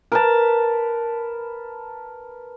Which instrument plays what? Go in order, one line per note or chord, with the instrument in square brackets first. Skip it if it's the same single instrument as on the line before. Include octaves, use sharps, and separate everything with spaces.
[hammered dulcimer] A#4 B4 A5